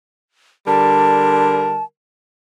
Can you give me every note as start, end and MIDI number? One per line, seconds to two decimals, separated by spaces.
0.67 1.81 50
0.67 1.81 55
0.67 1.81 70
0.67 1.83 81